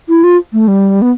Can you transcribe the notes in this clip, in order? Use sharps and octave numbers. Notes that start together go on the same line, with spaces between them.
E4
F4
A3
G3
B3